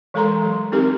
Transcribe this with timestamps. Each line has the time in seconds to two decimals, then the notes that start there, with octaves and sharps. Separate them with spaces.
0.14 E3 G#3 A4 A#4 A#5 C6
0.42 F#3
0.72 C4 D#4 G4 A#4